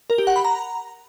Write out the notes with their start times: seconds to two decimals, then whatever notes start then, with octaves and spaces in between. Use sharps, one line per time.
0.10 A#4
0.18 G4
0.27 F#5
0.36 B5
0.45 A#5